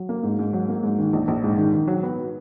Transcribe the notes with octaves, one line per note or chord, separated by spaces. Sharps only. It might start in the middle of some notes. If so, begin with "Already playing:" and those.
Already playing: F#3
A#3
G#2
G#2
F#3
A#3
G#2
D#3
A#1
A#1
G#2
D#3
D#3
F#3
B3